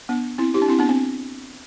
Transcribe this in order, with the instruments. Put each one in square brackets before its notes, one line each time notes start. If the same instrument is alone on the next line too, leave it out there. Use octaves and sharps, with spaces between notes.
[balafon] B3 D4
C4 E4
E4 G4
D4
C4 E4
B3 D4
C4